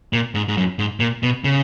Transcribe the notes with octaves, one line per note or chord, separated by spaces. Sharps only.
A#2
G#2
G#2
F#2
G#2
A#2
B2
C#3